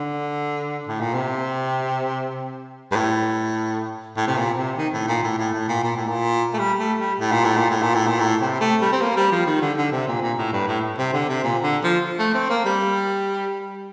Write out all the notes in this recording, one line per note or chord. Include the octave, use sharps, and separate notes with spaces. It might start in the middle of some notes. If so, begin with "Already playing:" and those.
Already playing: D3
A2
A#2
C3
G2
A2
A2
C3
A#2
C3
D#3
A2
A#2
A2
A2
A2
A#2
A#2
A2
A#2
A3
G3
A3
G3
A2
A#2
A2
A#2
A2
A#2
A2
A#2
A2
C3
A3
G3
C4
A#3
G3
F3
D#3
D3
D3
C3
A#2
A#2
A2
G2
A2
C3
D3
C3
A#2
D3
F3
A3
C4
A#3
G3